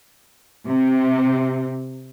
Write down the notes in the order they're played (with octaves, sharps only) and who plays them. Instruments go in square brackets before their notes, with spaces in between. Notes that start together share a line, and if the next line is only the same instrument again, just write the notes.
[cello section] C3